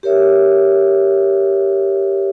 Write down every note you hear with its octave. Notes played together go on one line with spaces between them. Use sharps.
G4 A#4 C#5 E5